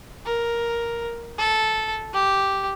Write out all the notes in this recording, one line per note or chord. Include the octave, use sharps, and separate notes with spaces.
A#4
A4
G4